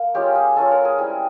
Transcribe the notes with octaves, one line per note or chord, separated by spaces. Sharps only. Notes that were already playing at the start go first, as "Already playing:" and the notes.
Already playing: A#3
G#3 C#4 F4 G4
G#4
G#3 C#4 F4 A4
A#4
G#4
G3 C4 E4 G#4